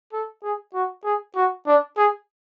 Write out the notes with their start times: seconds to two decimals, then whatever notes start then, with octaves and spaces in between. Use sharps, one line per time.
0.13 A4
0.43 G#4
0.74 F#4
1.04 G#4
1.36 F#4
1.66 D4
1.97 G#4